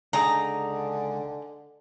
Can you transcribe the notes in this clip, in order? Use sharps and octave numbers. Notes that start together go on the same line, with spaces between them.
C#2 D3 D4 D#4 G#4 A#5